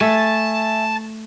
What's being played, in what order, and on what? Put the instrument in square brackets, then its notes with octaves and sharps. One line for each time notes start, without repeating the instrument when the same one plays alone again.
[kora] A3 [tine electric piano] E5 G#5 [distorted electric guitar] A5